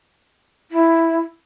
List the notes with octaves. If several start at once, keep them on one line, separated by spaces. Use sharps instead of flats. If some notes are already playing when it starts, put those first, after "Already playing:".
E4